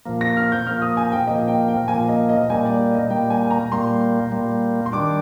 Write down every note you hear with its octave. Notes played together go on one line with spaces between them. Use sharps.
A#2 F3 A#3
A#6
F6
G6
A#2 F3 A#3 F6
D#6
G#5
G5
A#2 F3 A#3 D#5
G5
G5
A#2 F3 A#3 G#5
D#5
D#5
A#2 G3 A#3 G#5
D5
D5
D#5
A#2 G3 A#3 G5
G#5
G#5
A#5
A#2 G3 A#3 C6
A#2 G3 A#3
C6
D#3 G3 D4 D6